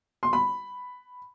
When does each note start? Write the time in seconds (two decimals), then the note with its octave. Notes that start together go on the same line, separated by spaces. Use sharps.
0.23 C6
0.33 B5